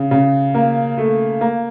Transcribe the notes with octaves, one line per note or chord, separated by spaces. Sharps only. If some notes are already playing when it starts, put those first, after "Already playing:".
Already playing: C#3
C#3
A#3
A3
A#3